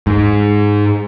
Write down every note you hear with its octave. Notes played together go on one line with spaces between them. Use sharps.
G#2